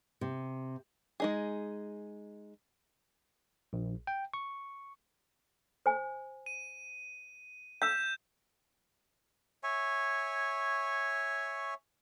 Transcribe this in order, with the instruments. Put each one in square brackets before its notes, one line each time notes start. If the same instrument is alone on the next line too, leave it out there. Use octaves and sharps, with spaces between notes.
[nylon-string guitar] C3
[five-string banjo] G#3 D#4 G#4
[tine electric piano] A#1
G5
C#6
[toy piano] C5 G#5
[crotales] D#7
[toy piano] F5 E6 [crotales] G6 E7
[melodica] C#5 E5 G#5 C#6